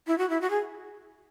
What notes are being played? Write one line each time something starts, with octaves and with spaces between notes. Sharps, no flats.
E4
F#4
E4
F#4
G#4